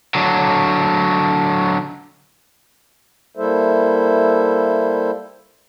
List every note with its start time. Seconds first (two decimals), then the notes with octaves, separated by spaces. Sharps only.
0.15 D3 F#3
3.37 G3 A#3 E4 A4 C5 E5